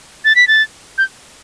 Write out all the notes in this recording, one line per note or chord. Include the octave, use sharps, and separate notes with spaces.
A6
B6
A6
G6